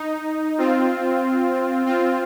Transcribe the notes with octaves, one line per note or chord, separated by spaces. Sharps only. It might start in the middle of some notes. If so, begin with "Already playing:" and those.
Already playing: D#4
C4 F4
C4 F4